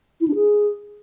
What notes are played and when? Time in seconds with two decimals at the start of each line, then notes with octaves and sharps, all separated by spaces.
0.21 E4
0.28 D4
0.35 G#4